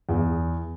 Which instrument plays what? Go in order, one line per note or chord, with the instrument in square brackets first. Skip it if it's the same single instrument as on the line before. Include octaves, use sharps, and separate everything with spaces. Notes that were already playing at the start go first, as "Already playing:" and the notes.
[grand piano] E2